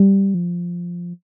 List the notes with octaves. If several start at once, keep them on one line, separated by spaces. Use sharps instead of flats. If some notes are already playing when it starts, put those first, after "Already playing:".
Already playing: G3
F3